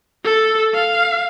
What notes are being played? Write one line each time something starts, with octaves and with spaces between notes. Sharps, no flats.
A4
F5